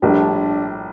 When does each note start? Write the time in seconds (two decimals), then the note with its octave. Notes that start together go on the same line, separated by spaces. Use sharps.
0.02 A#1 A2 G3 D4